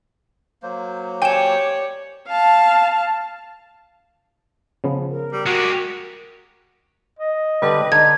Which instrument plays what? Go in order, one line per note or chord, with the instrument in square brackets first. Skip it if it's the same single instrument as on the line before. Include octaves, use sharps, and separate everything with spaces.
[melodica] F#3 A#3 C5
[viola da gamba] G4 C#5 D5 [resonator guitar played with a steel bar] G5 [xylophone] G#5 E7
[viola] F5 A5
[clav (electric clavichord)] C#3 F3 B3
[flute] A#4
[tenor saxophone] G3
[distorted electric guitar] G#3 G4 [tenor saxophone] F#4
[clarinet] D#5
[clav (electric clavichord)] D3 G3 [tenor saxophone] B4
[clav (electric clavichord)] D3 [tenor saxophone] D#4 [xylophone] G#6